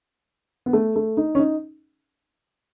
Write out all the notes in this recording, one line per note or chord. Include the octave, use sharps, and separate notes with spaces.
B3
A3
A3
D#4
C#4
D#4